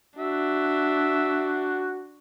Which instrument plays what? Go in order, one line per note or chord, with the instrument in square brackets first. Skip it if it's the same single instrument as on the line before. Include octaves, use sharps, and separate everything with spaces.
[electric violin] D4 [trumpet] F#4 [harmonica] E5